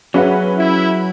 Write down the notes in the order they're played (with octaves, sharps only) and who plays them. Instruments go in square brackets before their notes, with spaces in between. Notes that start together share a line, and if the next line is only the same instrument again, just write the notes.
[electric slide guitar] F#3 [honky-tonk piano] C#4 B4 F#5 [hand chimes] F#4 G#4 E5
[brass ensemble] E4